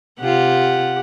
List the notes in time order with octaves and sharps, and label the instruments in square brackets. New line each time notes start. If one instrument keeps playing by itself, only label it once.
[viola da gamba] C3 F4 [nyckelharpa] G4 F#5